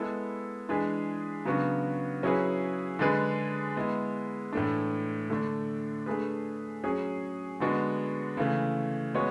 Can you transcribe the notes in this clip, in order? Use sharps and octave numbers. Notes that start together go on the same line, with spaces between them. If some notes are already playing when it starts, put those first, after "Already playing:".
Already playing: G#3 B3 E4 A4
E3 G#3 D4 G#4 B4
C#3 F#3 B3 D4 F#4
F#3 C#4 E4 G#4 B4
D3 G#3 D4 G#4 B4
G#3 B3 E4
A2 E3 A3 D4
D3 A3 D4
A3 D4 G#4 B4
F#3 C#4 G#4
D3 G#3 B3 D4 F#4
C#3 E3 A3
G#3 B3 F#4 C#5